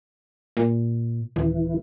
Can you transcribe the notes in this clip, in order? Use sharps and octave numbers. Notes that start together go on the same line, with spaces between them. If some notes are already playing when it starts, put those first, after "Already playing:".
A#2
D#1 E3